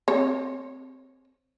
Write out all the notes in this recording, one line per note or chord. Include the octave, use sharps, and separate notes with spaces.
C4 C#5